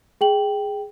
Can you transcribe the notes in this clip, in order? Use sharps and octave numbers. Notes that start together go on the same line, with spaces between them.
G#4 G5 F#7